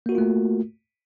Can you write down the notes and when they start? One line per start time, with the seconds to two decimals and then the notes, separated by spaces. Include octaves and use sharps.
0.06 A#3
0.09 F#4
0.12 A#4
0.15 F4
0.18 A3